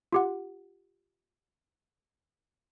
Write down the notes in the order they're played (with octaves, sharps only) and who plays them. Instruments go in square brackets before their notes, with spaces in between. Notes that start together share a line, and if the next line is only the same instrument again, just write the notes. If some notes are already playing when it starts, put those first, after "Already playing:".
[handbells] F4 G4 F#5